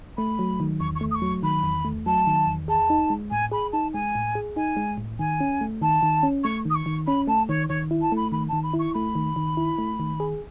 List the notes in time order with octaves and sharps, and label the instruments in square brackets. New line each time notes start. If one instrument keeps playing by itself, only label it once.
[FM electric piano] A3 [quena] B5
[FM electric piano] F#3
D#3
[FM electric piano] E2 [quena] C#6
[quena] C#6
[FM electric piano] A3
[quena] D#6
C#6
[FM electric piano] F#3
[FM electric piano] D#3 [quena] B5
[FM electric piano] E2
A3
[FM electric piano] F#3 [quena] A5
[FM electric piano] D#3
E2
[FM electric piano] G#4 [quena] A5
[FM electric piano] D#4
G#3
[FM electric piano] A2 [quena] G#5
[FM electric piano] G#4 [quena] B5
[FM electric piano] D#4 [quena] A5
[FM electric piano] G#3 [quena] G#5
[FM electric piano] A2
G#4
[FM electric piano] D#4 [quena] G#5
[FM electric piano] G#3
A2
[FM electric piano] D#3 [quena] G#5
[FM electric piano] C#4
A3
[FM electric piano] D#3 [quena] A5
[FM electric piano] D#3
C#4
[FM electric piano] A3 [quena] C#6
[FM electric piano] D#3 [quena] D#6
[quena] C#6
[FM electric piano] D#3
[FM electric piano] C#4 [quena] B5
[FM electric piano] A3 [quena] A5
[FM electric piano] D#3 [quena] C#5
[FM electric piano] D#3 [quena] C#5
[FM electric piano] E4
[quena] A5
[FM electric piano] A3 [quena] B5
[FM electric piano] D#3 [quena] B5
[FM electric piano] D#3 [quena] A5
[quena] B5
[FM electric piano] E4
[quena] C#6
[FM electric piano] A3 [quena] B5
[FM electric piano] D#3
D#3
E4
A3
D#3
G#4